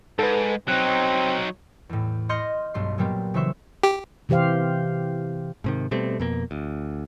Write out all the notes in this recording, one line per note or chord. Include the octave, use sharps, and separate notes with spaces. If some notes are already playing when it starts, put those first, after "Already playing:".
G#2 A4 B4
F#3 C4 D#4 F#6
E2 A2
D#5 C6 F6 G6 A#6 C#7
B1 G2 A3 C6
A#2 F#3 G3 A#3 B3 G4
C#3 E3 F#4 C5 E5 C#6
G4
C3 E3 G4 C5 F5
G#2 C3 D#3
B2 G3 A3 C4
F2 B2 A#3
D2